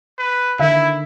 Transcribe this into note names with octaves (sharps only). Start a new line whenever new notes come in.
B4
D3 D#3 E4 A#4 E5